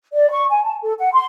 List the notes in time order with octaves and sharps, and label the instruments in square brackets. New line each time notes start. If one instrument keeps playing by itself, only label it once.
[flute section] D5
C#6
G#5
A5
A4
F#5
C6